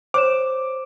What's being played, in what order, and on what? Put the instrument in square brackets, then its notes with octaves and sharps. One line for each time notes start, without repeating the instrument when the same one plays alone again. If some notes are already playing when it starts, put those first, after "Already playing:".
[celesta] C5 C#5 E7 [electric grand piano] D6